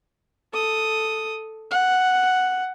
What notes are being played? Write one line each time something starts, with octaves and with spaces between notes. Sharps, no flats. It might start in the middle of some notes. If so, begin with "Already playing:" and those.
A4 D#6
F#5